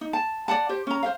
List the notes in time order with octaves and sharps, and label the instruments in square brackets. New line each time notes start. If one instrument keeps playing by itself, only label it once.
[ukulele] D#4
A5
D5 E5 F#5 A5
G4 C5
C#4 A#5
C5 E5 F5